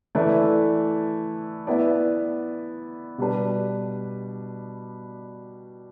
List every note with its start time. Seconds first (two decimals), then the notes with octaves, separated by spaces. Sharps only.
0.15 E3 A3 E4 B4 D5
1.67 B3 E4 B4 D5
3.18 B2 G3 D4 B4